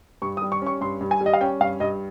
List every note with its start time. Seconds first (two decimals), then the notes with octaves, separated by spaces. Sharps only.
0.22 G2 C#6
0.37 D#6
0.42 G3
0.52 C#6
0.62 C#4 C#6
0.81 G2 C6
1.01 G2
1.11 G#5
1.21 G3
1.26 D#5
1.34 F5
1.41 C#4 G5
1.60 G2 F5
1.80 G2 D#5